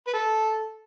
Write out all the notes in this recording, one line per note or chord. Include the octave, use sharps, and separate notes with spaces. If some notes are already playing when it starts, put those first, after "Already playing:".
B4
A4